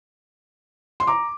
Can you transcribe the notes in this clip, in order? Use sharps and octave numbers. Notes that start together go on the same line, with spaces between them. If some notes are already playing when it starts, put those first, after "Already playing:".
C6
A#5 D6